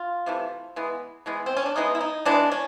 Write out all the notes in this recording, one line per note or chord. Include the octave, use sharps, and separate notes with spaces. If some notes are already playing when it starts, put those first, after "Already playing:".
Already playing: F4
C3 E3 A3
E3 G#3 B3
E3 G#3 B3
C4
C#4
D4
E3 G#3 B3 D#4
E4
D#4
E3 G#3 B3 D4
C#4